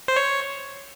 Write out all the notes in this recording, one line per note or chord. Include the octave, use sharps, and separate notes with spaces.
C5
C#5